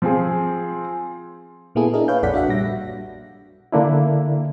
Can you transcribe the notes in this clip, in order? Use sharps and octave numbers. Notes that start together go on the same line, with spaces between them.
F3 C4 G#4
A#2 A#3 B3 E4 G#4 A4
D4 E4 G#4 A#4 D#5
B4 C#5 F5 G6
A#1 F2 A4 D5 F#5 B6
D4 F#4 E5 F#5
A#2 G3 A#6
D3 A#3 D4 E4